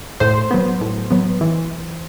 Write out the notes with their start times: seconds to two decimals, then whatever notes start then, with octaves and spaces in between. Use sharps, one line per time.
0.20 A2 C5
0.51 F#3 B3
0.81 A2
1.11 F#3 B3
1.41 E3